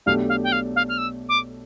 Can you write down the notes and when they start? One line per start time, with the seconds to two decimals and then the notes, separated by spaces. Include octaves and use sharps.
0.06 B1 B2 A3 D4 G4 F5
0.29 F5
0.44 G5
0.52 F5
0.76 F5
0.89 F6
0.98 E6
1.29 D6